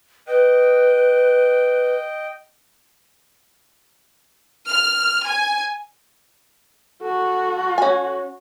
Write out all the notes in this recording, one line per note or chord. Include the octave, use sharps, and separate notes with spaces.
B4 D#5 G5
F6
G#5
F#4 A4
C#4 G#5